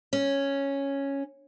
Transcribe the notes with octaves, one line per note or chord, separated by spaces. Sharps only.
C#4